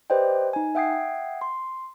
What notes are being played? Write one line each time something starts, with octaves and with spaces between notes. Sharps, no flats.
G4 B4 C5 D5 D#5 G5
D#4 G#5
E5 F#5 G5 D#6 G#6 C7
C6